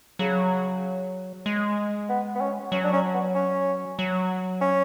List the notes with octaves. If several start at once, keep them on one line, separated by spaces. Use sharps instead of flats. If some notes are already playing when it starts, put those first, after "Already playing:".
C#3 F#3
G#3
B3
B3
C#4
F#3 C#4
D4
C#4
B3
C#4
F#3
C#4